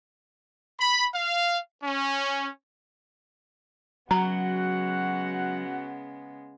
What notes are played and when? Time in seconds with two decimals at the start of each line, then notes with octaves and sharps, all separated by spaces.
0.79 B5
1.14 F5
1.83 C#4
4.11 C#3 F#3 G#3 B3 F#4 F#5 A#5